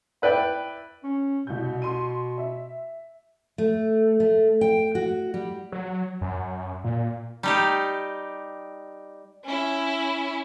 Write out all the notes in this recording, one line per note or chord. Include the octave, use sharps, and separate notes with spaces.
E4 B4 D5 G5
C#4
C2 B2 G6
C6 D#7
E5
A3
A3
G5
F#4
G3
F#3
F#2
A#2
G3 D#4 G4
C#4 E4